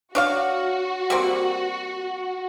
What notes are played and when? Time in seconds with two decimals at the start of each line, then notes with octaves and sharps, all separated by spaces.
0.15 D4 F#4 C#5 F5
1.10 G3 A#3 C4